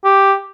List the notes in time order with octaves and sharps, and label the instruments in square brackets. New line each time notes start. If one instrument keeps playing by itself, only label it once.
[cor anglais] G4